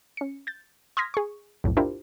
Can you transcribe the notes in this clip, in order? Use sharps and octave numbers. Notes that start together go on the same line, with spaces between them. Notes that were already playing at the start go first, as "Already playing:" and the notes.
C#4 C#7
G6 A6
C6 D#6 F6 G#6 A#6 B6
G#4 C#6
B1 F2 A2
D4 E4 F4 G4 A#4 C5